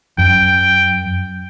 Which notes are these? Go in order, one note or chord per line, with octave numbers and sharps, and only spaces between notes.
F#2 G5